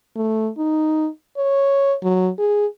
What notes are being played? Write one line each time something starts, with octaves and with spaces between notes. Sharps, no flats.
A3
D#4
C#5
F#3
G#4